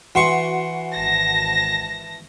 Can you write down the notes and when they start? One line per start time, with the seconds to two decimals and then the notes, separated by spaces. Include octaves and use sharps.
0.15 E3 F#4 C6 C#6
0.91 G#1 A5 A#6